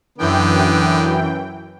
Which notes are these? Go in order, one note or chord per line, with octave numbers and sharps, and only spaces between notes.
F#2 D3 E3 B3 G5